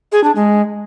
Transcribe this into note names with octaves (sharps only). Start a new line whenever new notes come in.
G#4
D4
G#3